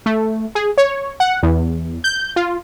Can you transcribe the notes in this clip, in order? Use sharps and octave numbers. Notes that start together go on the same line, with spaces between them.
A3
G#4
C#5
F#5
E2
G6
F4